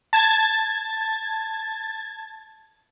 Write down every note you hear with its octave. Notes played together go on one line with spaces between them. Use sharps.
A5 G#6 A6